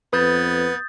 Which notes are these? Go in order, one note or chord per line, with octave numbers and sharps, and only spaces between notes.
F2 B3 B4 D#6 G6 A6